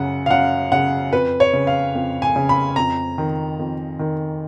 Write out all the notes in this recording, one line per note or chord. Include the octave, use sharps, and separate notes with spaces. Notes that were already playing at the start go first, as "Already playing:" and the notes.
Already playing: F#2 C#3 F#5
F5
F#2 F#5
C#3 F#5
F2 B4
C#5
C#3
F5
F2
G#5
C#3
B5
F2 A#5
D#3
F2
D#3